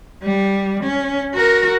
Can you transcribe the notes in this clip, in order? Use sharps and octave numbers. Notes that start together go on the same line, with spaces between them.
G3
C#4
F#4 A#4